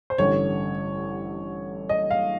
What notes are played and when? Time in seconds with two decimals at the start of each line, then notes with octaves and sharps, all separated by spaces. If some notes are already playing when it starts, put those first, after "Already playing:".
0.10 C5
0.18 A1 G2 D3 C#5
1.89 D#5
2.10 F5